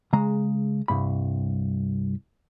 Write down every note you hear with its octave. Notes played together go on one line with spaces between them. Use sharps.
C#3 G#3 A#5
C2 G2 B5